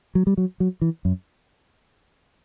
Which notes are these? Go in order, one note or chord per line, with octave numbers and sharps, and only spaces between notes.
F#3
G3
F#3
F#3
E3
F#2